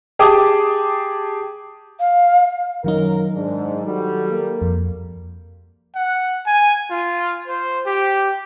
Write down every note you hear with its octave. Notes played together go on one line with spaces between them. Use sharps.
G4 G#4 G5 A5 D6 D#6
F5
F#2 D#3 F#3 D#4 A#4
G#2 D4
G3 F#4 A4
A#3
F2
F#5
G#5
F4
C5
G4